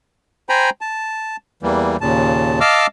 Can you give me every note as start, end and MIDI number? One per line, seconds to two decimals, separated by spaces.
0.49 0.70 72
0.49 0.70 79
0.49 0.70 80
0.49 0.70 82
0.49 0.70 83
0.81 1.36 81
1.63 1.96 40
1.63 1.96 52
1.63 1.96 55
1.63 1.96 58
2.01 2.60 39
2.01 2.60 46
2.01 2.60 49
2.01 2.60 81
2.61 2.87 75
2.61 2.87 77
2.61 2.87 81
2.61 2.87 86
2.61 2.87 88
2.61 2.87 89